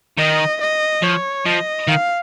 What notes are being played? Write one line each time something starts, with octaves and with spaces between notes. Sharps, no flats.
D#3 D#5
D#5
F3 C#5
F3 D#5
D#3 F5